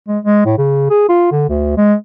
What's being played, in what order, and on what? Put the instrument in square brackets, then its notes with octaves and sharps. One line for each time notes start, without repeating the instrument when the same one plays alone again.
[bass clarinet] G#3
G#3
A2
C#3
G#4
F4
D3
D2
G#3